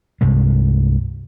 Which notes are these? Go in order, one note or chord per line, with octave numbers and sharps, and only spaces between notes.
C2 G2 C3 G#3